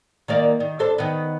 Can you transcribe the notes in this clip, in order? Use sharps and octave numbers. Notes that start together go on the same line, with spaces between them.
D#3 A#3 D5
D#3
D4 A4 C5
D#3 B3